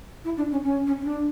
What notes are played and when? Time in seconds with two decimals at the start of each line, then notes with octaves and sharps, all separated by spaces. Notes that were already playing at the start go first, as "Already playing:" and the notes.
0.24 E4
0.37 D4
0.51 C#4
0.64 C#4
0.87 C#4
1.01 C#4
1.04 D4